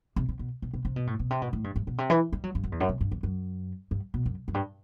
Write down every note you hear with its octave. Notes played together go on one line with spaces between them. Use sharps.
C3
C3
B2
B2
B2
C3
B2
A2
B2
C3
B2
A2
G2
G2
B2
C3
E3
G3
F#3
G2
F#2
E2
F#2
C3
G2
E2
F#2
G2
B2
F#2
F#2
G2